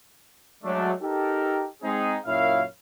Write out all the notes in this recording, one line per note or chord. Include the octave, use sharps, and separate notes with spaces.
F#3 G#3 A3 D4
D#4 G4 A4 A#4
G#3 C4 D#4 G#4
F#2 A#2 C#4 E4 F5